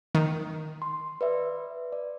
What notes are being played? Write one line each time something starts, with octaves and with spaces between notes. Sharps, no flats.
D#3
C6
B4 D5 E5
D5